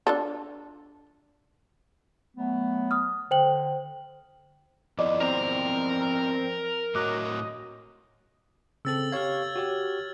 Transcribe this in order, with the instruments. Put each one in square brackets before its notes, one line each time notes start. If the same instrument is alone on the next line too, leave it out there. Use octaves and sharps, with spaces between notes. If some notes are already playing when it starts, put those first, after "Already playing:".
[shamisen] D4 F4 A4
[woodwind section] F#3 A3 B3
[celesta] D#6 F6
[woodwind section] D3 [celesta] C5 G5 F#7
[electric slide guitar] F3 B3 E4 [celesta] D5 D#5 D6
[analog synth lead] C4 [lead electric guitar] A#4 A#5
[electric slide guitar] A2 F#4 C#5 [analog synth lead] D#5 [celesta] D6 F#6
[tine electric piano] C#3 C4 A4 [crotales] E6 A6 F#7
[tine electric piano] G4 C#5 F5 [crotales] F6 G#6
[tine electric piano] F#4 G4 C#5